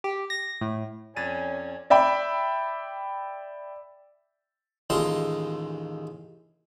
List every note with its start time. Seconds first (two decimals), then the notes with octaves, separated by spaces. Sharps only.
0.04 G4
0.30 A#6
0.61 A2
1.16 F2 C#4 D5 G#5 A6 D#7
1.90 D5 E5 G5 B5
4.90 A1 D#2 G#3 F4 A5 C6